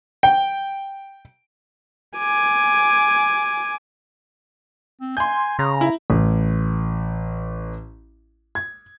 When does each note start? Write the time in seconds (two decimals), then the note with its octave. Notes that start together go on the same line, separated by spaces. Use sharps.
0.23 G5
2.18 G#5 D6
5.01 C4
5.17 G#5 C6 G6
5.59 C#3 A#5
5.81 E4
6.10 A1
8.55 G#6